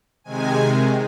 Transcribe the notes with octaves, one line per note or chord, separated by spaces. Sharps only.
C3 D#3 G#3 G#5